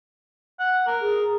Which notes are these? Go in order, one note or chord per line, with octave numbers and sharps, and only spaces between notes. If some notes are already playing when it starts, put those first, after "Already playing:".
F#5
A#4
G#4